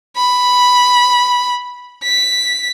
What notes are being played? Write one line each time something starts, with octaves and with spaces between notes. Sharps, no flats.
B5
B6